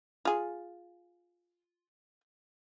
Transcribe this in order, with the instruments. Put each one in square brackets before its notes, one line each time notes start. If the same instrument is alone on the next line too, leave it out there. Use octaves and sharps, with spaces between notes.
[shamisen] F4 G#4